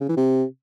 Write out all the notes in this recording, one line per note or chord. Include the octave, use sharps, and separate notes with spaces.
C#3
E3
C3